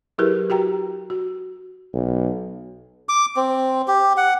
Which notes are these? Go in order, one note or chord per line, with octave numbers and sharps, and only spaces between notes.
F#3 E4 G4 G#4 A#4 B4
F#4 G4 G5 A#5
F#4
B1
D6
C4
G4
F#5